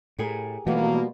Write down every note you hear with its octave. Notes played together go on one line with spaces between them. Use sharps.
A2 G4 G#4 A#4
B2 E3 F3 G3 A3 A#3 F#4